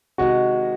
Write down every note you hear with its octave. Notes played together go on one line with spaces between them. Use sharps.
C3 D#3 G#3 F#4